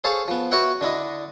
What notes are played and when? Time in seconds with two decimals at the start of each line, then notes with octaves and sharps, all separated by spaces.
0.04 G#4 A4 C5 C#5 F5 A5
0.28 F3 B3
0.51 F#4 B4 C#5 E5 F#5 G5
0.81 D3 D4 E4 D#5